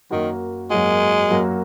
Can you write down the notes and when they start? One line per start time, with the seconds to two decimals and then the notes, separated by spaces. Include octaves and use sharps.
0.11 F#2 D#3 F#3 A#3 F#4
0.70 F#2 F#3 G#3 A#3 F#4
1.31 F#2 F#3 A#3 F#4